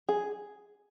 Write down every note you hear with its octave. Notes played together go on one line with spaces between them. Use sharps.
G#4